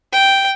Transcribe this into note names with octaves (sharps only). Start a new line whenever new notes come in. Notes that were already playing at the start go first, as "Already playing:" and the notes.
G5